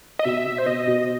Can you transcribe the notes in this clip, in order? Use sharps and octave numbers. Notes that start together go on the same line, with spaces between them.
D#5
B2 E5
B2
C5
B2 D#5
B2